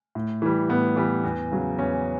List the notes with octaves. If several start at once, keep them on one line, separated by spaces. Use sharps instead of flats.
A2
E3 G3
A2 B3
E3 G3
E2
C#3 F#3
E2 C#4